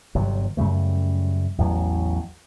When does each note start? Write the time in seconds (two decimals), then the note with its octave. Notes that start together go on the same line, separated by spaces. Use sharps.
0.15 G1 C3 F#3
0.57 F#2 C#3 G3 A3
1.58 A1 E2 F#3